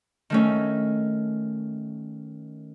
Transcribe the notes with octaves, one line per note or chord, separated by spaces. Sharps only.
D#3 A3 C#4